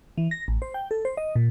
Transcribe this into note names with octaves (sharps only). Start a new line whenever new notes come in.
E3
A#6
A1
C5
G5
A4
C5
D#5
A#2